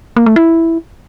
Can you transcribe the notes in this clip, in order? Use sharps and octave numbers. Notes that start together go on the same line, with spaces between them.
A#3
A3
E4